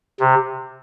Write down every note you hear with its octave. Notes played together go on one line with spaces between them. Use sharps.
C3